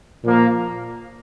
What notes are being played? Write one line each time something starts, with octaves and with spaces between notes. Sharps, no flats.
A#2 F3 A#3